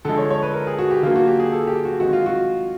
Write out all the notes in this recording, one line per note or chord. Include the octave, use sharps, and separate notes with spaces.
D3 F3 G#3 A4
C#5
C#5
B4
A#4
G#4
F#4
G4
D3 F#3 A#3 F4
F#4
G4
G#4
A4
G4
F#4
D#3 G#3 C4 F#4
F4
F#4